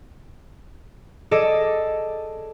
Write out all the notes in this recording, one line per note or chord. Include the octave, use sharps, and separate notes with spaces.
G#4 A4 D5 D#5